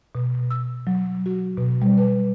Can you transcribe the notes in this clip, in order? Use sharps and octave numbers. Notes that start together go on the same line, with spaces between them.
B2
E6
F#3
F#4
B2
G3
B4